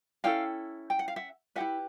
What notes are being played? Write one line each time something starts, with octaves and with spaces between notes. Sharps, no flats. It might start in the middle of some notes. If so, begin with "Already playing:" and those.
C#4 E4 A4 F5 G5
G5
F#5
F5
E5 F#5
E4 G4 B4 E5 F#5